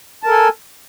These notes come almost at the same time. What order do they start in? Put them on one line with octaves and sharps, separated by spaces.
A5 A#4 A4 G#5